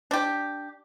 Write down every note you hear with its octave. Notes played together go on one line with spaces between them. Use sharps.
D4 G4